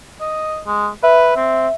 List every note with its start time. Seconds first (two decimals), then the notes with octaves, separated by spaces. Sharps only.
0.20 D#5
0.67 G#3
1.03 B4 E5
1.36 C4